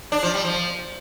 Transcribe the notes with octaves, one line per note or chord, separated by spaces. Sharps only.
D4
F3
G3
F3